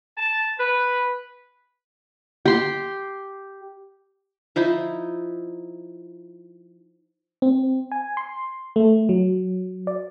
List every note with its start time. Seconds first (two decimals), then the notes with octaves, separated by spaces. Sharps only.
0.17 A5
0.59 B4
2.46 G4 C6
4.56 F3 D#4 E4
7.42 C4
7.92 G#5
8.17 C6
8.76 A3
9.09 F#3
9.87 D5